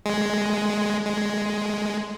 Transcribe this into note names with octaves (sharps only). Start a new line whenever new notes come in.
G#3
G#3